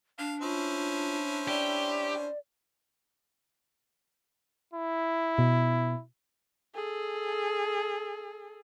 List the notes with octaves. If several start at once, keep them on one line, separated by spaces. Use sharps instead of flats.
D4 F5
C#4 E4 F4 C5
G4 D5
E4
B2
G#4 A4